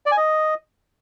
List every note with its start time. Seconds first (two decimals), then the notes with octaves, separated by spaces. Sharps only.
0.06 D5
0.12 G#5
0.17 D#5